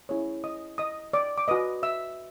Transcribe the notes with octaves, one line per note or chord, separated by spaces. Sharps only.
C#4 E4 G#4 C#5
D#5 D#6
D#5 D#6
D5 D6
D6
F#4 B4 D#5 D#6
E5 E6